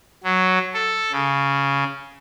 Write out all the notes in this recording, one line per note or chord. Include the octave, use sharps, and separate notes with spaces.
F#3
A4
C#3